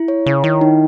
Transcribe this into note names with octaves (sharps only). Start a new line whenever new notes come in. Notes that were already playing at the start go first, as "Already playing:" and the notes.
Already playing: E4
C#5
C#3 C#5
D#3 E4
D#4